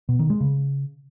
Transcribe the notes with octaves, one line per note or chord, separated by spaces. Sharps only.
B2
D#3
G#3
C#3